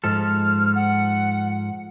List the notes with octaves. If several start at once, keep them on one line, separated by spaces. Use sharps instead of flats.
G#2 F3 A4 F6
F#5